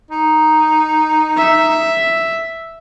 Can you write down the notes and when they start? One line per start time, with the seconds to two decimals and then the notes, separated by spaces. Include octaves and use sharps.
0.11 D#4
1.37 E5